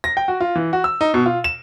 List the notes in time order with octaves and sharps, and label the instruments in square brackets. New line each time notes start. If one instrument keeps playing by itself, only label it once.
[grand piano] A#6
G5
F#4
F4
E3
F#4
E6
D#4
B2
F4
E7